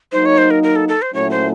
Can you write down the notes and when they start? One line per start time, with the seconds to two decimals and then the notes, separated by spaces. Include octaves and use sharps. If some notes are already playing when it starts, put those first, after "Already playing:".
0.12 F#3 A#3 D#4 C5
0.25 C#5
0.38 C5
0.50 A#4
0.63 A#4
0.76 A4
0.88 A4
1.02 C5
1.13 A#2 F#3 A3 C#4 E4 C#5
1.31 C5